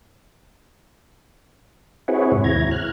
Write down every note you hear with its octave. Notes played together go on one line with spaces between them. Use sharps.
C4 E4 F#4 G#4 B4 C#5
G#2 C3
D#2 E4 A#5 G#6
F6 F#6